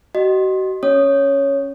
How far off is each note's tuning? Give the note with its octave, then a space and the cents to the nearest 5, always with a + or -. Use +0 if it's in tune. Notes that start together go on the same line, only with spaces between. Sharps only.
F#4 +40 D#5 -15
C#4 +0 C#5 +0 D#6 -10